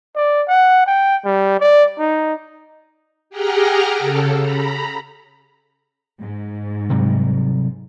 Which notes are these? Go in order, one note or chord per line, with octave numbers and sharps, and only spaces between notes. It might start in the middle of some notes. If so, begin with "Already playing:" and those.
D5
F#5
G5
G3
D5
D#4
G4 G#4 F#5 G5 A#5 F6
C#3 A4
A#5 B5
G#2
C3 F#3 G3